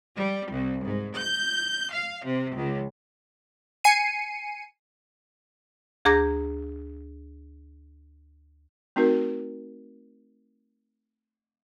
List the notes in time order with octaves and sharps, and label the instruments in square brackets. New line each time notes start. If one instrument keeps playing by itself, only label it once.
[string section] G3
C2
G#2
G6
F5
C3
C#2
[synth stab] G#5 C7 C#7 D#7
[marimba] D2 G#4 A#5 D6 G6 A#6
[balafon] A3 C4 D#4 F#4 A#4